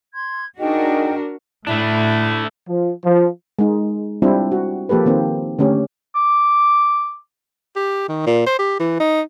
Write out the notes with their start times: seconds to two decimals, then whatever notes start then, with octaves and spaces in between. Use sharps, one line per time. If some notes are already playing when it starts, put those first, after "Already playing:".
0.14 C6 G#6
0.59 D4 D#4 F#4 G#4 A#4 D#5 G5
1.67 A2 A3 D4 E4
2.67 F3
3.04 F3
3.59 G#3 D#4
4.22 G3 C4 D4 E4 F4
4.52 F#4
4.89 F3 A#3 G4 A4 B4
5.06 D#3 A#3 C4
5.59 D3 A3 C#4 G4
6.15 D6
7.76 G4
8.08 D#3
8.27 A#2
8.47 C5
8.59 G4
8.80 E3
9.00 D#4